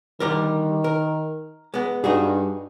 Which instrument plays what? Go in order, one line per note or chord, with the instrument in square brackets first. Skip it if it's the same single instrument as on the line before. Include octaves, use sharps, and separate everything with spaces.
[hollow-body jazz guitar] D3 G3 A#4 [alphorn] D#3
[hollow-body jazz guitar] A#4
G#3 B3
[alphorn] G2 [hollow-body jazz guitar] D#4 F#4 G#4